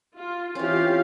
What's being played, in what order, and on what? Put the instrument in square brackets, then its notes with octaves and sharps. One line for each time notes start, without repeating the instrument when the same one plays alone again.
[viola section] F4
[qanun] E3 C#4 [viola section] C4 G4 F5 [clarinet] F4